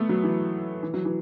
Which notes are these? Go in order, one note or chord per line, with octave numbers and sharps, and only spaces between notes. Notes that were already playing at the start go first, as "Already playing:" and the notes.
Already playing: A3 B3
F#3
E3
E3
F#3
E3